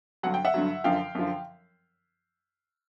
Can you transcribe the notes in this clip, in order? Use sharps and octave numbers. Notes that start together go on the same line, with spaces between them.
G2 D3 F#3 F#5
G5
E5 F#5
G2 D3 F#3
F#2 D3 F3 F5 G5
F#2 D3 F3